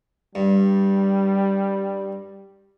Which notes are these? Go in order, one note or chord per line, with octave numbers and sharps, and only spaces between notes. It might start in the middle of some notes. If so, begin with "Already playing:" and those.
G2 G3